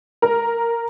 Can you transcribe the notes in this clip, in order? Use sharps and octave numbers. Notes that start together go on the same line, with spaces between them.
A#4